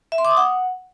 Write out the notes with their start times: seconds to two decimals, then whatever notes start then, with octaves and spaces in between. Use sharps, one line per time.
0.12 E5
0.18 C6
0.25 D6
0.31 D#6
0.37 F#5